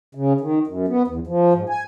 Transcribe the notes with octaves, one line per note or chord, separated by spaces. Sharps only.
C#3
D#3
F#2
B3
E2
F3
G#2
G#5